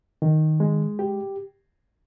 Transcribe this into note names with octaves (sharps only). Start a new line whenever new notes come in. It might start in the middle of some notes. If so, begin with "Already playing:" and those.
D#3
G#3
G4